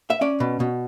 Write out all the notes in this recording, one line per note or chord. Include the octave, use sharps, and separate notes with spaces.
E5
C#4 D5
B2
B2